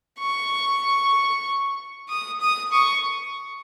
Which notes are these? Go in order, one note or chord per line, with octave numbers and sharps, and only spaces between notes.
C#6
D#6
D#6
C#6